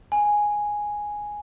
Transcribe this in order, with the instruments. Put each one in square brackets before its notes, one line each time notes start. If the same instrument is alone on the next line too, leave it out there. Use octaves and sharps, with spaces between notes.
[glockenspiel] G#5